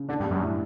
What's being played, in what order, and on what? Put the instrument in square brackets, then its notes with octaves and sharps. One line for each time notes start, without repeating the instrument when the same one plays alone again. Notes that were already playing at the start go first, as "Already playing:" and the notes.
Already playing: [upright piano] C#3
[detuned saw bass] D3 [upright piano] D4
[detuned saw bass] G2
[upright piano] G3
[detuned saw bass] F#2
[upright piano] A2